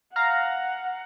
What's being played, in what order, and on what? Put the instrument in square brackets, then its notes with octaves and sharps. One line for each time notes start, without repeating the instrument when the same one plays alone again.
[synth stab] F5 A#5 [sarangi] F#5